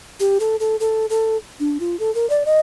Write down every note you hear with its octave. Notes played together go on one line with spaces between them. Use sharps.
G4
A4
A4
A4
A4
D4
F4
A4
A#4
D5
D#5